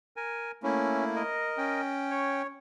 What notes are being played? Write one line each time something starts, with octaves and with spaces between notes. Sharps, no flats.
A#4 G#5
A3 A#3 C#4 E4
A#4 D#5
C#4 G5
C#5